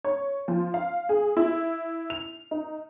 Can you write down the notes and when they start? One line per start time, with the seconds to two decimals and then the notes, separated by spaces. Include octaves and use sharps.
0.04 C#5
0.48 F3
0.74 F5
1.09 G#4
1.37 E4
2.10 F7
2.51 D#4